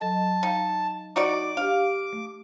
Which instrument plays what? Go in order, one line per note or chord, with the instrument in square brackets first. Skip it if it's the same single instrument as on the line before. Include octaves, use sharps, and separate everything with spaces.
[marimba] F#3 A4 D#5 [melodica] A5
[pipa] D#4 [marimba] F5 G5
[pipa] D#4 F#4 D5 [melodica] D6
[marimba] D4 G4 [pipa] F5
[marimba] A3